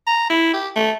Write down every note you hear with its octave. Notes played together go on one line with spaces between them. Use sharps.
A#5
E4
G4
A3